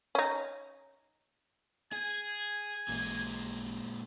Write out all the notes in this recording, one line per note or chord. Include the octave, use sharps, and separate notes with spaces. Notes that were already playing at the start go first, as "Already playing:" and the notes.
C#4 D#4
G#4 G#5
A1 A#2 G#3